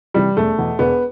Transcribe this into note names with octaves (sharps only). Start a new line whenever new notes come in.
C3 E3 G3
E1 A3
E2 B2
E1 B3